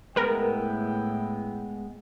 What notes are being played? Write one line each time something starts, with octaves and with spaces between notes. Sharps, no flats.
A2 G#3 B3 E4 A#4 B4 G5